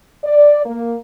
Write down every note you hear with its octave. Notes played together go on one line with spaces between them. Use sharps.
D5
A#3